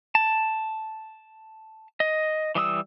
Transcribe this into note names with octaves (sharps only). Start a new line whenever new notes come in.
A5
D#5
E3 G3 D#6 E6